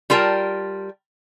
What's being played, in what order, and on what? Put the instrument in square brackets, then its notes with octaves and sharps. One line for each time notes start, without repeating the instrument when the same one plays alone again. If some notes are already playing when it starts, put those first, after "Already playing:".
[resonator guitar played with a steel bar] G3 F4 A#4 G5 A5